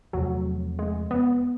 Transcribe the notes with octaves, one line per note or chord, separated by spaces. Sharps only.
E2 C3 F3 F#3 A3
G#3
B3